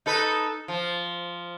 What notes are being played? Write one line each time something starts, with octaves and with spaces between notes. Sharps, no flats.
D#4 A4 B4
F3